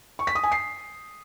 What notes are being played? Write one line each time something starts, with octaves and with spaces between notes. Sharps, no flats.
C#6
B6
D#6
G#5
C7